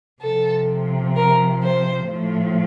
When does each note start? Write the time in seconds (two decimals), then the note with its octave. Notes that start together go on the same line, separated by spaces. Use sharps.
0.22 C3 F3 A4
1.17 A#4
1.64 C5
2.11 A2 F3